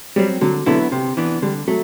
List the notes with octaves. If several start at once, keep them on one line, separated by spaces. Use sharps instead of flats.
F#3 G3 C4
D3 F#3
D3 F#3 B3 E4
C3
E3 B3 D4
D3 G3
F#3 A3